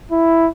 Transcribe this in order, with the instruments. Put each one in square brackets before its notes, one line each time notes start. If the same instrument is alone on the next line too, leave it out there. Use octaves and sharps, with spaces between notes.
[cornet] E4